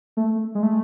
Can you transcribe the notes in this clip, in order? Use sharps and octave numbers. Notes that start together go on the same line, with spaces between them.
A3
G#3
A3